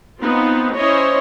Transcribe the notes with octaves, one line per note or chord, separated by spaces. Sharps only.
B3 C4 D#4 F4
C#4 E4 C5 C#5 D#5